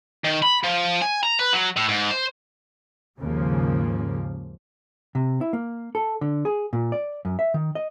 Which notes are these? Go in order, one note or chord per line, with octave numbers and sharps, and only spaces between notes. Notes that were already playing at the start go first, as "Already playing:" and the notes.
D#3
B5
F3
G#5
A#5
B4
F#3
A2
G#2
C5
D#2 G#2 C#3 F3 A#3
C3
E4
A#3
A4
D3
G#4
A#2
D5
F#2
E5
D#3
D#5